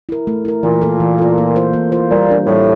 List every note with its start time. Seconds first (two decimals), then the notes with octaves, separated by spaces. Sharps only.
0.09 E4 A#4
0.27 A3
0.45 E4 A#4
0.63 A#2 E3
0.81 A#3 F4 A4
1.00 E3
1.18 A#3 F4 A4
1.38 A#3
1.56 F4 C5
1.73 A#3
1.92 F4 C5
2.11 A#2 G3
2.29 D4 F4
2.47 A2 G3